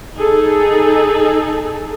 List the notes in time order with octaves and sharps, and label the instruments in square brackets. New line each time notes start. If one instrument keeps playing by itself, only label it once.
[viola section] D#4 G#4 A4